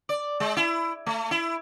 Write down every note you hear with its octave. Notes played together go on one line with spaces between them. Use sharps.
D5
G#3
E4
A3
E4